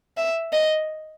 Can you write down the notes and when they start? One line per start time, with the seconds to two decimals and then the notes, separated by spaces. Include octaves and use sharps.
0.17 E5
0.53 D#5